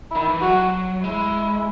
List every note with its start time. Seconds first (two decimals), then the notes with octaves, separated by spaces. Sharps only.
0.11 D#3 E4
0.28 E3
0.42 F#3 F#4
1.03 G#3 E4